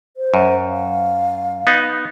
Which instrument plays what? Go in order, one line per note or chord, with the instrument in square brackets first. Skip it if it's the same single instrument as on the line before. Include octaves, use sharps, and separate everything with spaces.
[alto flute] C5
[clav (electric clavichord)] F#2
[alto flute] F5
[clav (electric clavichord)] B3 D#4